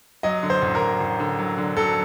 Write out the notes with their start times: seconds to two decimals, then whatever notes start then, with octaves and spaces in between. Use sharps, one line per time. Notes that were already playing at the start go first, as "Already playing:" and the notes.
0.23 F#3 D#5
0.43 D3
0.50 C5
0.62 A1
0.75 A#4
0.81 A1
1.01 A1
1.20 D3
1.39 F#3
1.58 D3
1.77 F#3 A4